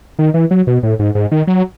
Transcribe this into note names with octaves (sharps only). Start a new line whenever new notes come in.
D#3
E3
F#3
B2
A2
G#2
G#2
D#3
F#3